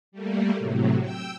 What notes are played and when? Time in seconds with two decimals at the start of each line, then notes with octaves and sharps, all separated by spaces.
0.12 G3 A3 A#3
0.56 A2 C3 F#3
1.00 G5 E6